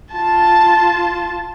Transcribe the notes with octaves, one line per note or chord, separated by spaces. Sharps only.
F4 A5